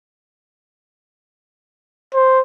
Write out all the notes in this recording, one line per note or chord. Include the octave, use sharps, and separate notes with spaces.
C5